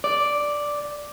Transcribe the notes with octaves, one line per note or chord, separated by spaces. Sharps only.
D5